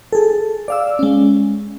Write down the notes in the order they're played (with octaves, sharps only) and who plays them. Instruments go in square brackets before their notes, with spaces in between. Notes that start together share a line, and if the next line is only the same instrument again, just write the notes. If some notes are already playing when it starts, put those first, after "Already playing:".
[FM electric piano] G#4 A4
D5 F5 E6
G#3 C#4